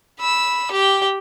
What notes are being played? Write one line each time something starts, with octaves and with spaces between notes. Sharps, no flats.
B5 E6
G4 G5